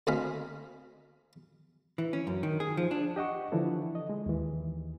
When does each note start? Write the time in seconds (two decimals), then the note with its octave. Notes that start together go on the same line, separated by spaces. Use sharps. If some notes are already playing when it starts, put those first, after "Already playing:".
0.07 D2 C4 D#5 F5 G#5 B5
1.98 E3
2.13 C#4
2.27 F#2
2.43 D#3
2.60 G#4
2.77 F3
2.91 D4
3.16 G4 D#5 F#5 C#6
3.52 D3 E3 F3 D4 E4 A4
3.95 D#5
4.10 G#3
4.26 D#2 E3